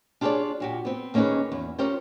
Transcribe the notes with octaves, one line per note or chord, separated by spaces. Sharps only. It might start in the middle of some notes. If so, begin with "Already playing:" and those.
D4 F4 G4 G#4 C#5 D5
A#2 F#4 G4
B3 C4
D#2 A#3 C#4 D#4 G#4 B4
E2
C#4 F4 G4 A#4 C5